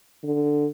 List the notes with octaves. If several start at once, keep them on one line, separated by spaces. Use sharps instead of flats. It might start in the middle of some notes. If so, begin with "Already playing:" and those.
D3